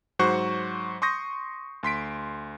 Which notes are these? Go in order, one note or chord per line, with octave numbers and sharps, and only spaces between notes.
G#2 F#3 F#4 C5 C#6 F#6
C6 C#6 D#6 G6 A#6
D2 C6 B6 D7